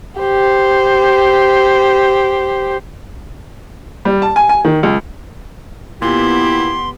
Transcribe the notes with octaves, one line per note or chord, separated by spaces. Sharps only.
G4 C5
G3
A5
G#5
G#5
D#3
C#2
A#2 B3 E4 G4 C6